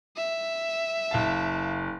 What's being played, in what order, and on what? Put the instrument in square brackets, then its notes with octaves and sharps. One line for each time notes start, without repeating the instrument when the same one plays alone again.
[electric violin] E5
[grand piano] F#1 F5 A5